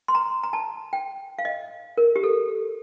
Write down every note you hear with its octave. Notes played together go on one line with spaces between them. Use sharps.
C6
A#5
A#5
A5
G5
F5
D#5
A#4
G4
A4